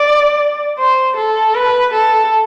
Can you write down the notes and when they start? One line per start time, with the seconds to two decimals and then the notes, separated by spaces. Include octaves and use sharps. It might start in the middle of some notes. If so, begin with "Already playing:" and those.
Already playing: D5
0.78 C5
1.17 A4
1.55 B4
1.94 A4